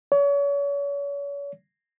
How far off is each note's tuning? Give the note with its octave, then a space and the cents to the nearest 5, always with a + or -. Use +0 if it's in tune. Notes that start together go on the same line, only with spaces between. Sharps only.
C#5 +35